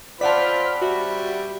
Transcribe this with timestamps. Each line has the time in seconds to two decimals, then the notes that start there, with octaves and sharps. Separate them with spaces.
0.21 C4 F4 D5 F#5 A5 B5 F6 B6
0.82 G3 F#4 E5